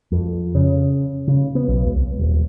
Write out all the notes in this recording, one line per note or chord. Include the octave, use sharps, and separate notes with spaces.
F2
C#3
C#3
B3
B1
C#2
D#1